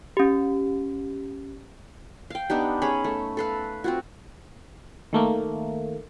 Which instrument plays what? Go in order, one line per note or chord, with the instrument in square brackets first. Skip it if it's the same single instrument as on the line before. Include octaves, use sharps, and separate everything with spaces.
[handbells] C#4 G4
[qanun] F5 G5
B3 D4 D#4 G4
C#4 G#4 C#5 B5
A3
A4 B4 F5
C4 F4 F#4
[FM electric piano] D#3 A3 A#3